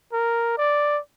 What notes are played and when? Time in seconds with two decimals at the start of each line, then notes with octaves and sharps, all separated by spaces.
0.13 A#4
0.58 D5